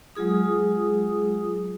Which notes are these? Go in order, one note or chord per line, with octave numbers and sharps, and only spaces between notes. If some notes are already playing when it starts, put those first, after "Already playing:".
F#3 G#3 F4 G#4 D#6